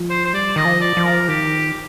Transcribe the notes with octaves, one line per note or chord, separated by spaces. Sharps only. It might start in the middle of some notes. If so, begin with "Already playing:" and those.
Already playing: F3
C5
C5
G3 D5
D#3 D#5
F3
D5
F3
A#4
D#3 G4